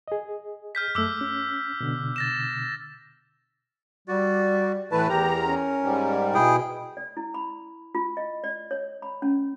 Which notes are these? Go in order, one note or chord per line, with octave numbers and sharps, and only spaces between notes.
G#4 D#5
F6 G6 B6
F#2 A3 D6 E6
C#4
B2 D3
A6 A#6 E7
G3 F#4 D5
A2 E3 A3 E4 B4 A5
E2 G4 A#4 A#5
C#4
G#2 G3
B2 E4 G#4 G5
D5
E4
B5
F4
D#5
D5
C#5
B5
C#4